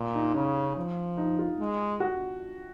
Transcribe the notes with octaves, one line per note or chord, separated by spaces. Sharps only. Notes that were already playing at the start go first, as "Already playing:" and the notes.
Already playing: A#2
D#4
C#3 C#4
F3
D#4
F4
G#3
F#4